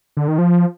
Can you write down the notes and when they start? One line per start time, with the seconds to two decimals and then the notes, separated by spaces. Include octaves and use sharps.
0.17 D3
0.28 D#3
0.38 F3